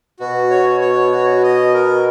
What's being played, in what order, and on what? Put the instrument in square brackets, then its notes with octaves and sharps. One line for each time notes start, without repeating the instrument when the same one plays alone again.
[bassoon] B2 [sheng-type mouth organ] F#4
[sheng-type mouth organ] C#5
C#5
F#4
D#5
A#4